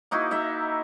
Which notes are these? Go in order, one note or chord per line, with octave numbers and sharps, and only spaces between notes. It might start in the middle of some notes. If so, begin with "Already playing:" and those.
A#3 D#4 E4 F#4
D#4 E4 E5 A#5